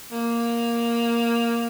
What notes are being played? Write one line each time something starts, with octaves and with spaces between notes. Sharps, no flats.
A#3